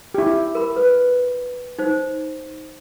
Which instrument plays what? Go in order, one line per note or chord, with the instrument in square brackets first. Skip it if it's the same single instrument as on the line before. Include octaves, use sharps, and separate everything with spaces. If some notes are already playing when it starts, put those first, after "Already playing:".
[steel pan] E4 G4
[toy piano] A#4 B5
B4
D#4 C5